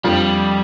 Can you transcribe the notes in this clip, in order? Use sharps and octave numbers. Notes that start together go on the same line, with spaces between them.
F2 F3 G3 D4 F4